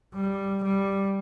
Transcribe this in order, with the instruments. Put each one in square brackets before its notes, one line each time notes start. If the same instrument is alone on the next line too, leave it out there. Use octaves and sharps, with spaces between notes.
[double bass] G3
G3